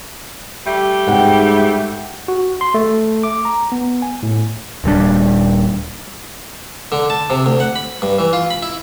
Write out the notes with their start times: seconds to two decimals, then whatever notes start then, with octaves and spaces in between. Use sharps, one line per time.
0.66 G3 A3 G4
1.08 G#2 F#5 G5
2.28 F#4
2.61 C6
2.74 A3
3.23 D6
3.45 A#5
3.72 B3
4.02 G#5
4.23 A2
4.84 D#1 A#2 G3 D4
6.92 D3
7.10 A5
7.30 C3
7.46 D2
7.60 F#5
7.76 B5
8.02 G2
8.19 E3
8.33 F4
8.50 B5
8.62 E4